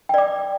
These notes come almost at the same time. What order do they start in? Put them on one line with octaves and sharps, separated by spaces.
G5 D5 D6